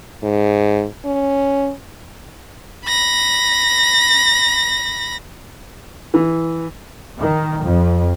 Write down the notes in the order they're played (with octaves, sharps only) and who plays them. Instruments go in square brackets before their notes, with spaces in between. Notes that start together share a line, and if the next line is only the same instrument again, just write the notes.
[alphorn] G#2
C#4
[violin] B5 A#6
[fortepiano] E3
[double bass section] D#3
F2